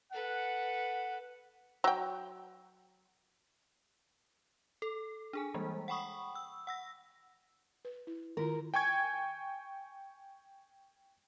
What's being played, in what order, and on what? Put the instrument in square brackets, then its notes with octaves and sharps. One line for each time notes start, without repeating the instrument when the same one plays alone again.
[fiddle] A4 B4 [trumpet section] F#5
[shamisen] F#3 G5
[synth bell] A4
D4 G#4 G#5
E3 G3 G#3 A#3
F#5 G5 B5 C#6 D#6
E6
F#5 E6 A#6
[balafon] B4
E4
[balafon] D#3 E4 F4 [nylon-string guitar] A#4
[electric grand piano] G5 G#5 C#6 G#6